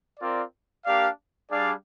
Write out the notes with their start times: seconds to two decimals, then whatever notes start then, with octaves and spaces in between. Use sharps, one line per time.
0.20 C4 F4 A#4 D5
0.85 A#3 D4 G4 D5 F5
1.51 G3 D4 G#4 D5 F5